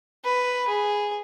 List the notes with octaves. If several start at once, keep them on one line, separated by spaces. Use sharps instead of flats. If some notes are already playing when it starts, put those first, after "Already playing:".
B4
G#4